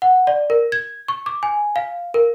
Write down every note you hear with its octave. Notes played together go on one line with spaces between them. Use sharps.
F#5
D5
A#4
G#6
C#6
D6
G#5
F5
A#4